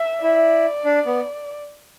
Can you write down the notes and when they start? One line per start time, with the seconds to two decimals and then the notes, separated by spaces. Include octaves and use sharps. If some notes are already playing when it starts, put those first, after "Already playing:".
Already playing: E5
0.23 E4 D5
0.85 D4
1.06 B3